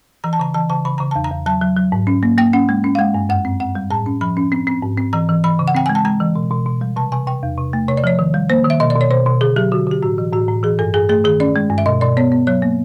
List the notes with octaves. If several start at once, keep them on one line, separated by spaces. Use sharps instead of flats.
E3 A#5
A5
C#3 A#5
E3 A5
C#3 A5
C#3 B5
C#3 A#5
E2 A5
A#5
E2
F#3 A5
F#3
F#3
G#2
C#4
A#3
A#3 G5
C#4 F#5
G#3
C#4
F5
G#3 F#5
G2
F#2 F#5
C4
C4 F#5
G3
A2 A5
C#4
F3 B5
C#4
C4
C4
G#2
C4
E3 A#5
E3
E3 B5
C#3
F#5
C4 G5
G#3 G#5
A5
G#3 A#5
E3
B2
B2
B2
G3
C3 A5
C3 G#5
C3 G5
E2
C3
A3
C3 C#5
D5
F3 C#5
D#3
G3
A#3 C5
D#3
E5
B2 D#5
D5
B2
C#5
B2 C5
B2
D3 G#4
F#3 G4
D3 F#4
D3 G4
A2 F#4
E3
A2 F#4
A2
E3 G#4
G2 A4
G2 G#4
A3 G#4
D#3 G#4
C#4 D5
G#3
G2
E5
B2 D#5
B2 D5
B3 C#5
B3
F#3 C#5
A#3